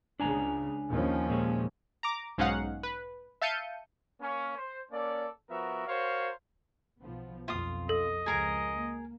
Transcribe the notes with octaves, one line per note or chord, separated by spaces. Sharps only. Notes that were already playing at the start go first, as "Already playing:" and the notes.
C#2 C#3 D4 G#5 A#5
D#2 F3 C#4
A#2 G#3
A#5 D6
B1 G#2 C#4 D#4 F5 F#5
B4
E5 F5 A5 G6 C#7 D#7
A#3 C#4
C5
A#3 C#4 A4 D5
F3 B3 F#4 A#4 E5
F#4 A#4 C5 C#5 F5
B1 F3 B3
B1 F2 F4 F5 D#6
A4 D#5
C#2 F3 G#4 A#4 G#5
A#3